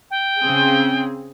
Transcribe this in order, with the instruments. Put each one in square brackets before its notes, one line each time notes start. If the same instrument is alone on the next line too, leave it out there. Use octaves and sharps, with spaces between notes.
[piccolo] G5
[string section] C#3 C4 G#4